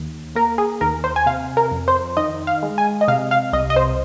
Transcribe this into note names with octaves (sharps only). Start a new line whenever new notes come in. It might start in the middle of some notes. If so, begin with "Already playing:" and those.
Already playing: D#2
A#3 A#4
G#4
D#2 A#4
C5
G#5
C3 F5
A#4
F2
C5
D#3 D#5
F5
G#3
G#5
D#5
C3 F5
F5
C2 D#5
D#5
C5